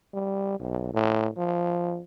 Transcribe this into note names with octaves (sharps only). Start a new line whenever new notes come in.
G3
B1
A2
F3